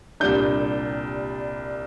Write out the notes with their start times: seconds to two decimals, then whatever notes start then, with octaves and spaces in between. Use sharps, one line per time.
0.20 C2 A#2 G3 D4 G6